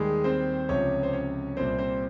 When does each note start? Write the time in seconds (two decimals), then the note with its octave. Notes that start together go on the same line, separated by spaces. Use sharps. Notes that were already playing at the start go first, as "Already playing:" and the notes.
Already playing: D#2 D#3 G3 G#3 G#4
0.24 C4 C5
0.69 C#2 C3 F3 C#4 C#5
1.03 C5
1.13 C#4 C#5
1.57 C2 A#2 G3 C4 C5
1.78 C4 C5